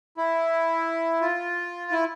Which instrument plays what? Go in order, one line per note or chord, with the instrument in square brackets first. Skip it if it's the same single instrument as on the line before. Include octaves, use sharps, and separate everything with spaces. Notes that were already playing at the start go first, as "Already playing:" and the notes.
[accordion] E4
F4
E4